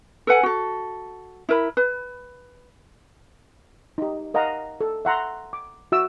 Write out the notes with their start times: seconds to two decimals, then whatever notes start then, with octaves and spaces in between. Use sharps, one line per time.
0.27 A4 B4 F#5 G#5
0.43 F#4 A4
1.49 E4 A#4 B5
1.77 B4
3.98 D#4 G4
4.34 A#4 D#5 F5 F#5 A#5
4.81 A4
5.05 E5 F#5 A#5 C6
5.53 D6
5.92 F#4 E5 E6